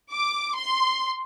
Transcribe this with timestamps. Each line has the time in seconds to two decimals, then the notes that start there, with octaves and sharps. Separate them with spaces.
0.12 D6
0.56 C6